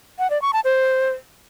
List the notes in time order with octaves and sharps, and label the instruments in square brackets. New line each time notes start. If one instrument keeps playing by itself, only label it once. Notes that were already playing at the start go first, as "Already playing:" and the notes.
[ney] F#5
D5
C#6
A5
C5